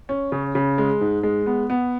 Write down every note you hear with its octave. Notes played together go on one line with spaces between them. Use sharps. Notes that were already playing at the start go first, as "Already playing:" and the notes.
C#4
C#3
C#3
G#3
G#2
G#3
B3
B3